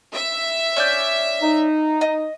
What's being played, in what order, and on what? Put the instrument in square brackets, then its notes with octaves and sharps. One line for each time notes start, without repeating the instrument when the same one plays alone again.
[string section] E5
[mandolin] C#4 D5 G6
[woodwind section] D#4
[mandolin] D#5